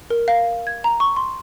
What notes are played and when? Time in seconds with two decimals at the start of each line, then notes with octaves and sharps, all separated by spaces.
0.10 A#4
0.28 F5
0.67 G#6
0.84 A#5
1.00 C#6
1.16 C6